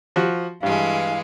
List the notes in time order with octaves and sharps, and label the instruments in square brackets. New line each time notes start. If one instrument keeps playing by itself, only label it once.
[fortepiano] F3 F#4
[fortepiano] G2 [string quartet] E3 G#3 [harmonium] F5